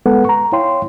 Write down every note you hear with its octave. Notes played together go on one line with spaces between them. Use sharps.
G#3 B3 A4 B4 F#5
A#5 C#6
E4 C#5 F5 G5 C6